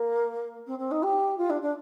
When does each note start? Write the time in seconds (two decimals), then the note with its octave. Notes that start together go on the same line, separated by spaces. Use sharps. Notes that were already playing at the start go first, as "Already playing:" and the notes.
Already playing: A#3
0.66 C4
0.78 C4
0.91 D#4
1.02 G4
1.37 F4
1.49 D4
1.61 D4